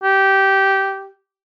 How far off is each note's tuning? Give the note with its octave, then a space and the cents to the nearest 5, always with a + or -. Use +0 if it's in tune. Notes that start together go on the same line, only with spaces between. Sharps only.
G4 -15